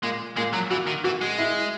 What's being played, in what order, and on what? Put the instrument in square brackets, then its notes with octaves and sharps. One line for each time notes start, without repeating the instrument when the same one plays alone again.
[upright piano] A#2 [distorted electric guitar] G#3
[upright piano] A#2 [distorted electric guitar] G#3
[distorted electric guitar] F#3
[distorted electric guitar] E3 [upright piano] F#4
[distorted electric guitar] D#3
[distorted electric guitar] E3 [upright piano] F#4
[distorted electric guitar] G#3
[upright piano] E4